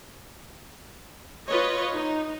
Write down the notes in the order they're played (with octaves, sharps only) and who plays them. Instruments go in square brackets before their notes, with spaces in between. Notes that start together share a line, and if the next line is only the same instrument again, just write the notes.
[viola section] F4 B4 C#5 D#5
D#4